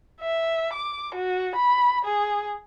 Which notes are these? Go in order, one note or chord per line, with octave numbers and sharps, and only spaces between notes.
E5
D6
F#4
B5
G#4